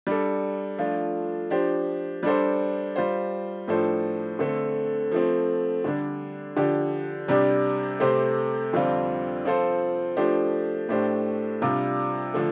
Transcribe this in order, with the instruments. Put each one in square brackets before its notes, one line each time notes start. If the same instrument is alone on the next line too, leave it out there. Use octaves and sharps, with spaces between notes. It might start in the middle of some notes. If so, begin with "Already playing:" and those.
[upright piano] G3 D4 A4
F3 A3 D4 F4
F3 D4 G4 C5
G3 D4 A4 C5
G3 F4 C5
A2 F3 D4 A4 C5
D3 A3 C4 A4
F3 A3 C4
D3 G3 D4
D3 F3 D4 G4
C3 G3 D4 G4
C3 A3 C4 G4 C5
F2 D3 G3 C4 F4
F3 C4 F4 A4 C5
F3 A3 D4 G4 C5
A2 A3 D4 G4 C5
C3 G3 D4 F4
D3 F3 A3